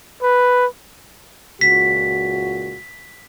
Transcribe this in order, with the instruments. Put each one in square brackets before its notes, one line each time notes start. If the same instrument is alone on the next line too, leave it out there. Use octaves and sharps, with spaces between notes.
[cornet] B4
[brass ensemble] C#2 A#2 F#4 [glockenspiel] B6